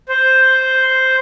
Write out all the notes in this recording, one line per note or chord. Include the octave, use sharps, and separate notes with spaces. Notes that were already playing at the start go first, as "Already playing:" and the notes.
C5